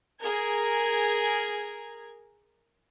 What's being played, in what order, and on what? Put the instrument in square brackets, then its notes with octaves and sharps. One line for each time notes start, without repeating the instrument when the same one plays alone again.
[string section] G#4 A#4 G#6